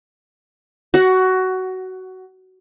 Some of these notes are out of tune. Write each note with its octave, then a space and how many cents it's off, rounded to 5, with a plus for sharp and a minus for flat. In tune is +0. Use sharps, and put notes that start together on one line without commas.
F#4 +15 F#5 +0